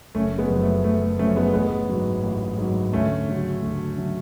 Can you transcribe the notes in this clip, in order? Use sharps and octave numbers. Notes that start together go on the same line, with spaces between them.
F#1 A3 C#4
G#3 B3
F#2 F3
A3
F#1 A3
A3
F#2 F3 A3 C#4
G#3 B3
A1 G#3 B3
G#2 F#3
A1
G#2 F#3
D2 A3 C#4
C#3 F#3
D2
C#3 F#3